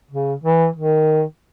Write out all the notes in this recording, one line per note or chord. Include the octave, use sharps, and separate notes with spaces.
C#3
E3
D#3